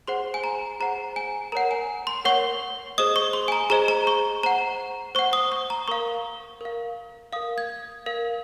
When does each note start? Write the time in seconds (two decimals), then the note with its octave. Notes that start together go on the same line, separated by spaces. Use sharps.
0.08 G#4 C5 F#5 C6
0.34 G#5
0.44 A#5
0.80 G#4 C5 F#5 A#5
1.16 G#5
1.52 A#4 C#5 F#5 A#5
1.71 G#5
2.07 C6
2.25 A#4 C#5 F#5 C#6
2.98 G#4 C5 D#5 D#6
3.16 C#6
3.33 C6
3.48 G#5
3.52 A#5
3.70 G#4 C5 D#5 A#5
3.88 A#5
4.07 C#6
4.43 C5 F#5 A#5
5.15 C5 C#6
5.19 F#5
5.33 D#6
5.52 C#6
5.70 A#5
5.88 A#4 F5 C#6
6.61 A#4 F5
7.33 F5 D#6
7.36 A#4
7.58 G#6
8.06 A#4 F5